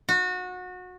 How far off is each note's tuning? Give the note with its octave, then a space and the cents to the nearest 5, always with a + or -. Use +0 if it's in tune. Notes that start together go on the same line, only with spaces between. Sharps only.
F#4 -25